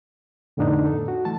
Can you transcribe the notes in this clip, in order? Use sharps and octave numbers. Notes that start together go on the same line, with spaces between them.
F2 A2 D3 B3 D4 D#4
A4
F#4
E3 A3 A5